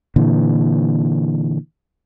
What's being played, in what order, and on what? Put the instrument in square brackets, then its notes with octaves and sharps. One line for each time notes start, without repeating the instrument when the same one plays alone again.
[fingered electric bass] A#2 D3 E3